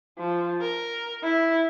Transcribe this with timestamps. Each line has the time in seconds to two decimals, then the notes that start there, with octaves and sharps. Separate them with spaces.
0.18 F3
0.61 A#4
1.23 E4